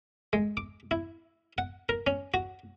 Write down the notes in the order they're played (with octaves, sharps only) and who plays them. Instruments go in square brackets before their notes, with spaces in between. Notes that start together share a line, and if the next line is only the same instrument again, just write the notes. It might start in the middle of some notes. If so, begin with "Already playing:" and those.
[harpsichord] G#3
D6
E4
F#5
A#4
C#4
F#4